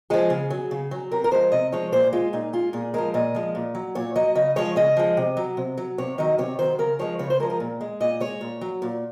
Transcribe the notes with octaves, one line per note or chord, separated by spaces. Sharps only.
F3 G#3 G#4
C#3
F#3
C#3
F#3
C3 A#4
A#4
F3 G#3 C5
C3 D#5
F3 G#3 C#5
A#2 C5
G#3 F4
A#2 D#4
G#3 F4
A#2 G#4
F3 G#3 A#4
A#2 D#5
F3 G#3
A#2
F#3
A#2 C#5
F#3 D#5
C#3 D#5
F3 G#3 C#5
C#3 D#5
F3 G#3
C3
F#3
C3
F#3
C3 C#5
D#3 F#3 D#5
C3 C#5
D#3 F#3 C5
C#3 A#4
F3 G#3 C#5
C#3 C#5
C5
F3 G#3 A#4
A#4
A#2
G#3
A#2 D#5
G#3 C#5
A#2
F#3
A#2